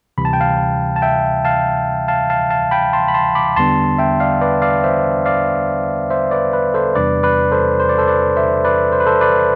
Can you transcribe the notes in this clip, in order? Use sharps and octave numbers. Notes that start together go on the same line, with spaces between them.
D2 C3 E3 G3 B5
A5
G5
F5 A5
A5
E5 G5
F5 A5
F5 A5
F5 A5
F5 A5
G5 B5
A5 C6
B5
A5 C6
B5 D6
E2 D3 G3 B3 D4 A5 C6
E5 G5
D5 F5
B4 D5
D5 F5
C5 E5
D5 F5
C5 E5
B4 D5
B4
A4 C5
E2 C3 G3 D4 B4 D5
B4 D5
A4 C5
C5
D5
A4 C5
B4 D5
C5 E5
B4 D5
C5
B4
A4 C5
B4 D5